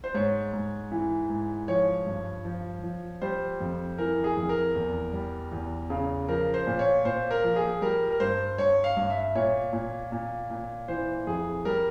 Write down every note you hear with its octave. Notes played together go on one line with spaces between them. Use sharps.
C5
G#2 C#5
G#2
E3
G#2
F3 C#5
G2
F3
F3
G3 C5
F2
E3 A#4
G#4
F2
A#4
E2
G3
E2
C#3
F3 A#4
C5
A#2
C#5
A#2 C5
A#4
F3
G#4
G3 A#4
A#4
G2 C5
G2 C#5
F5
G2
E5
A#2 C#5
A#2
A#2
A#2
E3 C5
F2 G#4
G3 A#4